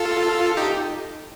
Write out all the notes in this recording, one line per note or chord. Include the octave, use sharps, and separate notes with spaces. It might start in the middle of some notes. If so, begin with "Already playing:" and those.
Already playing: F4 A4
D#4 G4